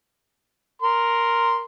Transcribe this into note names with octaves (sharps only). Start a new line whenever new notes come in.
A#4 C6